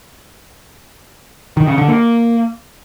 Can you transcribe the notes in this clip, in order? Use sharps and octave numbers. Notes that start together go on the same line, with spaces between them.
D#3
C#3
D3
A#3